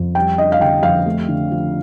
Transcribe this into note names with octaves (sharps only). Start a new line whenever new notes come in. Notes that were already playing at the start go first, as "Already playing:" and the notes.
Already playing: F2
G3 G5
D4 D#5
F5
D3 G5
F2 F5
A3
D3
F3